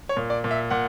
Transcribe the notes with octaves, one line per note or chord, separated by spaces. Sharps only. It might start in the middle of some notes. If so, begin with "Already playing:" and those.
C#5
A#2
D5
A#2
E5
A#2 F#5